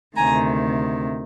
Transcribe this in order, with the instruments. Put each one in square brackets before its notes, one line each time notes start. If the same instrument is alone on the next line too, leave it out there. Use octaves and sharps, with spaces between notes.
[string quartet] D2 C3 D#3 G#5 A#5